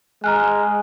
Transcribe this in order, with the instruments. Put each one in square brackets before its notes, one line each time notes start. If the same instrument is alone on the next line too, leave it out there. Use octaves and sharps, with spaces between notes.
[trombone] G#3 [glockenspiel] G#5 [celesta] A#5 F6 F#6